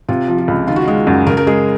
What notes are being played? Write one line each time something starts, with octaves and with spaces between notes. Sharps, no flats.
C3 F4
F3
F4
C#2
D#3 F4
F#4
G#3 F4
F#2
C#3 A#4
A#4
G#3 G#4